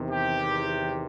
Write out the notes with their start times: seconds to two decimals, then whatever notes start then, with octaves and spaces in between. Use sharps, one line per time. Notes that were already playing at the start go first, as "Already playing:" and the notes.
Already playing: E2 C3 D#3
0.11 G4